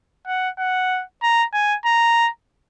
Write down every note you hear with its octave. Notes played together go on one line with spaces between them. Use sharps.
F#5
F#5
A#5
G#5
A#5